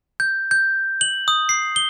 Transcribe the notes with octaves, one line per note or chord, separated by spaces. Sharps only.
G6
G6
F#7
D#6
C7
G7